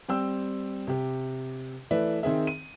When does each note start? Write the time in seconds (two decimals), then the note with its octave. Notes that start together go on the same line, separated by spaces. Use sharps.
0.08 G3 C4 G5 E6
0.87 C3 G4
1.91 E3 A3 B4 D5 E5
2.23 D#3 C4 G#4 E5
2.47 D#7